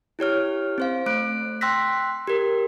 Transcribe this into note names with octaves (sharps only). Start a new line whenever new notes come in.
E4 G4 C#5 F6
C4 C5 F5
A3 F#6 D7
G5 C6 E6 F#6 A#6 B6
G4 A#4